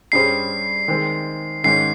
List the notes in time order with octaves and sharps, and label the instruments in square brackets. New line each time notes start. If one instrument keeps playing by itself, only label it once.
[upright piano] G2 G3 C#4 G#4 C5 [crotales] C7
[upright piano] D#3 G#3 C4
[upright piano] G#2 D#3 G#3 C#4 [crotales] C7